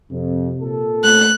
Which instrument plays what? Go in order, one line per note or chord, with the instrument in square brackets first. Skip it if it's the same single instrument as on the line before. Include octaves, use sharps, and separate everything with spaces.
[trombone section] F2 [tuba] C3
[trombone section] A#2 A4
[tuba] A3 [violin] F#6